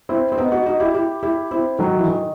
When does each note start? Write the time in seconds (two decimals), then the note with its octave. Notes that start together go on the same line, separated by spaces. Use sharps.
0.09 C4 E4
0.32 C4
0.38 B3 D#4
0.52 D#4 F#4
0.66 D#4 F#4
0.80 E4 G4
0.94 E4 G4
1.23 E4 G4
1.51 C4 E4
1.79 D#3 F#3
1.97 E3
2.07 D#3